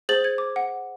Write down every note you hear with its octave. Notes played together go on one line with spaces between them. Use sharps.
G#4 C5 A6 F#7
G#6
D6
F#5